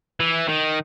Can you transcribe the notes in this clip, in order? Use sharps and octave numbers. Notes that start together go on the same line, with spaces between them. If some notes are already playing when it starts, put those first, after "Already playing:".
E3
D#3